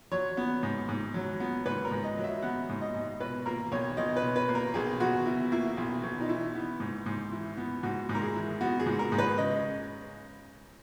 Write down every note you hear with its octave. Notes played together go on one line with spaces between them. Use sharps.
F#3 C#5
B3
G#2
G#2
F#3
B3
G#2 B4
A#4
G#2
D#5
F#3
E5
B3 F#5
G#2
D#5
G#2
B2 B4
A#3 A#4
B1 C#5
B1 D#5
B4
B2
B4
A#3
A#4
B1 G#4
B1 F#4
B2 E4
A#3 E4
B1
B1
D#4
E3 E4
B3
G#2
G#2
E3
B3
G#2 F#4
G#2
A#4
G#4
E3
B3 F#4
G#4
G#2
A#4
G#2
B4
C#3 D#5